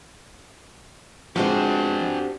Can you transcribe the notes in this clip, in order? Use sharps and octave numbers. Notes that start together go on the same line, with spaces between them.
F3 G#3 C4 D4 F#4 G4 A4